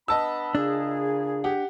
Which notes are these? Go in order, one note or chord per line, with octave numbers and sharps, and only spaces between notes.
B3 D4 D#5 A5 B5 E6
A#2 C#3 D4 G#4
G4 F#5